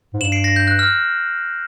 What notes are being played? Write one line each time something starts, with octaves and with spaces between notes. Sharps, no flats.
G#2
G2 E7 F#7
C7 D7
A#6 C7
G6
F#6
F6